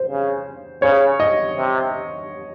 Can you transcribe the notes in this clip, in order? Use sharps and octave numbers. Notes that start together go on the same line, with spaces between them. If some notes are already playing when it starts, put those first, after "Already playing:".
Already playing: C5
C#3
C#3 C#5
D#5
C3